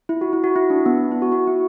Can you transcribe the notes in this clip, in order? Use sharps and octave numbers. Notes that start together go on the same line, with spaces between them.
E4
F#4
E4
F#4
E4
D4
B3
E4
F#4
F#4
E4